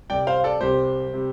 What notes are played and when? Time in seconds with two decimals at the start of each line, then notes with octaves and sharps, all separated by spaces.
0.10 C2 C3 G3 D5 G5
0.27 C5 F5
0.44 A4 D5
0.61 C2 C3 G3 G4 C5
1.14 C3 G3